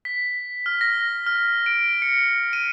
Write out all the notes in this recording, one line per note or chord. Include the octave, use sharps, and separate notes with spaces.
B6
F6
A#6
F6
D7
C#7
D#7